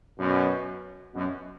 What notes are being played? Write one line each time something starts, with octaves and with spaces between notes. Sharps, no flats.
F#2 B2
F#2 B2